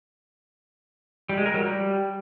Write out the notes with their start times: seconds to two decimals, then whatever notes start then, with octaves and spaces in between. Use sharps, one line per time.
1.29 G3
1.38 G#3
1.46 A#4
1.54 F#3
1.62 G3